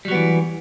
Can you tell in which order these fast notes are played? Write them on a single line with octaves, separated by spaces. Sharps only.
G3 F#3 B3 E3